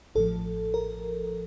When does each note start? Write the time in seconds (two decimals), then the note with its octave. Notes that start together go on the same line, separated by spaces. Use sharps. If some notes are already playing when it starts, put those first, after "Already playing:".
0.15 A1 A2 F3 A4
0.74 A#4